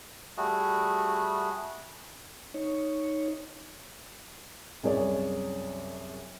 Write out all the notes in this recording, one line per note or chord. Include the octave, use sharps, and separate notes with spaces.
G3 A3 F#4 G#4
D#4 C#5
C2 F#2 G#4 C#5 D5